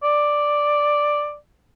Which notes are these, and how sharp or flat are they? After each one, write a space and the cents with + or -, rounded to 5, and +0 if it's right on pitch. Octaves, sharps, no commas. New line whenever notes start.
D5 +5